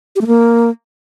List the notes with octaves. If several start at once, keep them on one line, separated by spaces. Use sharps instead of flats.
G4
A3
A#3